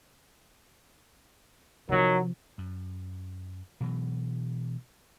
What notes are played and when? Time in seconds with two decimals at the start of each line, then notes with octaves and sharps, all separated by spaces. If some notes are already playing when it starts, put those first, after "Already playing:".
1.89 C3 D#3 F3 F#3
2.58 F#2
3.80 B2 E3 F#3